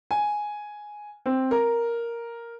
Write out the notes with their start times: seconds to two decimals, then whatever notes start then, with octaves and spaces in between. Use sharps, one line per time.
0.11 G#5
1.26 C4
1.51 A#4